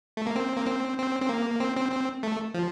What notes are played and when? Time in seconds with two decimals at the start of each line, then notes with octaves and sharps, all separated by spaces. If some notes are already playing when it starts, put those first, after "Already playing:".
0.17 A3
0.27 A#3
0.36 C4
0.57 A#3
0.67 C4
0.98 C4
1.22 C4
1.29 A#3
1.60 C4
1.77 C4
1.92 C4
2.23 A3
2.54 F3